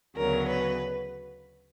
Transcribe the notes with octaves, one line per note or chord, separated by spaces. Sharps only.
D2 C#3 F#3 B3 A#4
B4